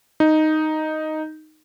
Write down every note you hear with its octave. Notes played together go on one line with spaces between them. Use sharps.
D#4